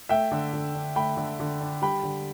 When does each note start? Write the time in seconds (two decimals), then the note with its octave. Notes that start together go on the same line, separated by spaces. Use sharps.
0.09 A3 E5 G5
0.31 D3
0.53 D3
0.75 D4
0.96 A3 G5 B5
1.17 D3
1.40 D3
1.60 D4
1.82 G3 G5 B5
2.03 D3